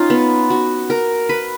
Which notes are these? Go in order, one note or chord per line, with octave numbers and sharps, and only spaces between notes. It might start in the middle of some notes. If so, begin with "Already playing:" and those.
Already playing: C#4 D#4 F4
B3
F#4
A#4
B4